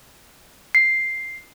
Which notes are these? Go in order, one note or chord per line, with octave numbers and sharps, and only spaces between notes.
C7